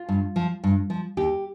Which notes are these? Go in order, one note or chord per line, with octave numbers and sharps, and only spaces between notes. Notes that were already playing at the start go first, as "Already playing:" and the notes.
Already playing: F4
G2
F3
G2
F3
D#2 G4